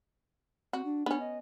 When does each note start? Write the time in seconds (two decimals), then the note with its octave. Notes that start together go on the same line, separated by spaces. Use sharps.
0.73 C4 F#4
0.85 D4
1.06 B3 C#4 D4
1.20 D#5